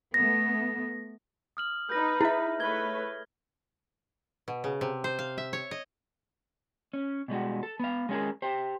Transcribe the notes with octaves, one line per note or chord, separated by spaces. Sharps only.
A3 B3 A#6
D#6 F6 F#7
D#4 B4 G6 A#6
E4 G#4 E5
A3 B4 C#5 G#6 G7
B2
C#3
C3
C5
F5
E5
C#5
D#5
C#4
B2 G3 G#3 F#4
A4
B3 F5
G#3 A3 C#4 E4 G#4 A#4
G4 C5